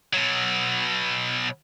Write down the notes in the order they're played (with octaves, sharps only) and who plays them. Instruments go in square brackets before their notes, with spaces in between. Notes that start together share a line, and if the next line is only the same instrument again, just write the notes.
[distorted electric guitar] B2 F#3